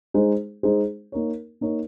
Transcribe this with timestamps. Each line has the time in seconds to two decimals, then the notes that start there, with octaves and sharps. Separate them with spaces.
0.14 G#3 D#4 G#4 C5
0.63 G#3 D#4 G#4 C5
1.12 A#3 D#4 A#4 C#5
1.61 A#3 D#4 A#4 C#5